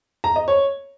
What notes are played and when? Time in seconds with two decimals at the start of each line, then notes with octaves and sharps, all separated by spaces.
0.24 A#5
0.36 D#5
0.48 C#5